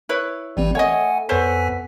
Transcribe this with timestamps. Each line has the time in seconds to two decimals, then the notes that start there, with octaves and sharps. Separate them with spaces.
0.09 E4 B4 C#5
0.57 G#1 E3 G3 C4
0.75 A3 C#5 D#5 F#5 G#5
1.29 F2 B3 A4 C5 C#5 G#5 B6